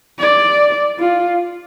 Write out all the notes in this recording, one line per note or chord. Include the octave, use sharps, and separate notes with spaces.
D5
F4